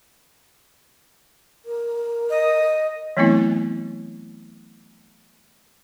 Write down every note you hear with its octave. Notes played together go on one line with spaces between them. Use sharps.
A#4
D#5
E3 F#3 A3 B3 C4 E4